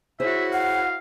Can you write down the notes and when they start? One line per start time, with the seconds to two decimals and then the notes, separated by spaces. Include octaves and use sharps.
0.20 E4 F#4 G#4 C5 C#5 E5
0.53 F5 F#5